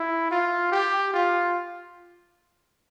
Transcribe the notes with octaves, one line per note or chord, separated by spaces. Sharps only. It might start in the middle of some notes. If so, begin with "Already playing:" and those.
Already playing: E4
F4
G4
F4